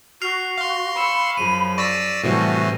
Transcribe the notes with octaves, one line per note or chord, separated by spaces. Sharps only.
F#4 F6 C7 F7
F5 C6
B5 C#6 E6
F#2 C#3 F3 D#7
D5 C#6 E6 A#6 B6
A2 C3 E3 G3 A3 F#4